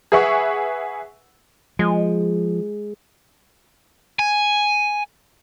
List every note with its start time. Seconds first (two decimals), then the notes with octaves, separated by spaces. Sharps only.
0.12 G#4 B4 E5 F#5 C#6
1.79 F3 G#3
4.19 G#5